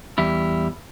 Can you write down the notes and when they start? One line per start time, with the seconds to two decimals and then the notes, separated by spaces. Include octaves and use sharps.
0.18 E2 G3 E4